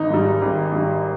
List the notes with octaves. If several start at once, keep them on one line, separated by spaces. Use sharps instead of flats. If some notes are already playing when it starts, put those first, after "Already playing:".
Already playing: G#1 D#4
G#2 G3
G#1
G#2 G3